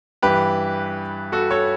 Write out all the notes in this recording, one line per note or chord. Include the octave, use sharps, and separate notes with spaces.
G2 E3 G4 B4
F#4 A4
A4 C#5